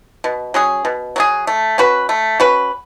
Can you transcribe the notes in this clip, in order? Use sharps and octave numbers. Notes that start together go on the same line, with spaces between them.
B2
F#3 C#4 G#4
B2
F#3 C#4 G#4
A3
C#4 F#4 B4
A3
C#4 F#4 B4